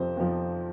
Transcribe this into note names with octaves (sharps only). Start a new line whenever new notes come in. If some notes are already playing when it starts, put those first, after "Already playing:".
Already playing: F2 C3 F3 C5
F2 C3 F3